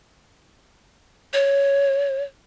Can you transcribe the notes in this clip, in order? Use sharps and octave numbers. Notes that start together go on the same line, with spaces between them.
C#5